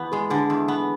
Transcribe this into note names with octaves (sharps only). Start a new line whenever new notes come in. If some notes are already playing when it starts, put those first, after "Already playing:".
Already playing: E2 B3
G#3 G#4
D3 G#4
E2
B3